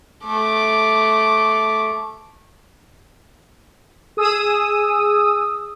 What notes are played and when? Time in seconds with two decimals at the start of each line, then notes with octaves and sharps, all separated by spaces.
0.24 A3 D6
4.17 G#4 D#6 E6